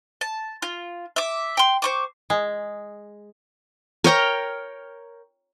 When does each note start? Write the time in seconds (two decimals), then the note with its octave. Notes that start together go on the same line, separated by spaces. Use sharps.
0.21 A5
0.62 F4
1.16 E5 D6
1.57 G5 C6
1.82 C5 C#6 D6
2.30 G#3
4.04 A#4 C#5 G5 A#5